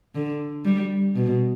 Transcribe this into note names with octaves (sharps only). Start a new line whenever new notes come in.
D3
G3
B2